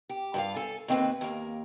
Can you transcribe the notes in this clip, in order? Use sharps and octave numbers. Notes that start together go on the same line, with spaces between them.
G4
G2 F4 F5
A4 G#5
D#2 C4 B4
D#2 A#3